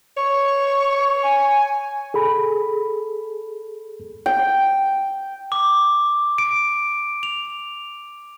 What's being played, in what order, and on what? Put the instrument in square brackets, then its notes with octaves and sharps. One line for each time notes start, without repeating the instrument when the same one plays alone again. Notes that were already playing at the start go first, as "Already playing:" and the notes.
[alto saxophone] C#5 [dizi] C#6
[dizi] G#5
[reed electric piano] G#4 A4 B5
[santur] G5
[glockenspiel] D6
D7
F7